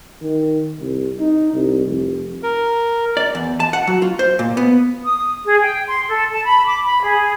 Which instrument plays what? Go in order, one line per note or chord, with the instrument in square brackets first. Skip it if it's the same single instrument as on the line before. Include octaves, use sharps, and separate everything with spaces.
[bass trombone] D#3
C2
D#4
C2
F1
[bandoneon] A#4
[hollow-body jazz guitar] D5
E2
A5
F#5
F#3
F4
C5
A#2
B3
[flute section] D#6
G#4
G5
C6
A4
A5
B5
D6
B5
G#4